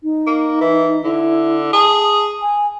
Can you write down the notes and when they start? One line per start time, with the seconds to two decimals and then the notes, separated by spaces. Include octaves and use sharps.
0.03 D#4
0.26 A#3
0.60 E3
1.04 D3 E4
1.73 G#4 A5
2.42 G#5